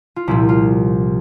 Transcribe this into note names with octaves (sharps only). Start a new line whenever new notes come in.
F4
C2 A#2 F3 E4
F4